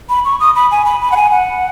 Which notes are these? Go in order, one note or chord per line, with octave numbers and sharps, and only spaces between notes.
B5
C#6
D#6
B5
G#5
B5
B5
F#5
G#5
F#5